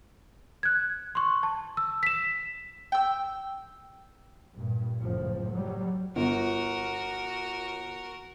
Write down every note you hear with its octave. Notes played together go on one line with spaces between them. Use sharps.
F#6 G#6
C6 C#6
A5
E6
B6 E7
G5 E6
G2 A#2
F#1 A2 F3
F#3 G3
G1 F#4 A#4